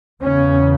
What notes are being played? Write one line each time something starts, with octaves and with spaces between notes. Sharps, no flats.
E2 C#3 C#4